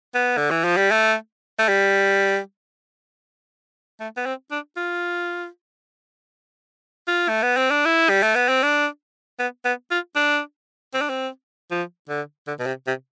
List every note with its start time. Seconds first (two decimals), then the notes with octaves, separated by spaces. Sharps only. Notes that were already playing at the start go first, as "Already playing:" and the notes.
0.14 B3
0.37 D3
0.51 E3
0.64 F3
0.77 G3
0.91 A3
1.59 A3
1.68 G3
4.00 A3
4.16 B3
4.26 C4
4.51 D4
4.77 F4
7.07 F4
7.28 A3
7.42 B3
7.57 C4
7.70 D4
7.85 E4
8.09 G3
8.22 A3
8.35 B3
8.48 C4
8.63 D4
9.39 B3
9.65 B3
9.91 F4
10.16 D4
10.94 C4
11.01 D4
11.09 C4
11.71 F3
12.09 D3
12.47 D3
12.59 B2
12.66 C3
12.87 C3